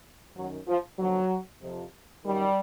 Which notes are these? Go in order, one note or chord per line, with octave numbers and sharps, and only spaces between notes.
F#2 D#3 F#3
F3
D#2 D3 F3 F#3
F2 C3 F3
F#2 D#3 G3